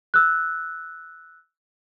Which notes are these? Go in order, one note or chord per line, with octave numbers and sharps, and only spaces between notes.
E6 F#6